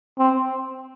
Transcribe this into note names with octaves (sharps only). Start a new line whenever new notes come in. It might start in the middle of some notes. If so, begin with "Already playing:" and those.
C4